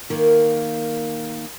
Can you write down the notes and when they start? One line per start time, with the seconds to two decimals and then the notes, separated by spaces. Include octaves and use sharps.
0.10 D#3 A#3